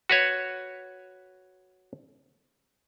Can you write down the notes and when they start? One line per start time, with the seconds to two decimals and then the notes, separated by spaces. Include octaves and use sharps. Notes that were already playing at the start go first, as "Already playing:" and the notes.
0.09 F#4 B4 C#5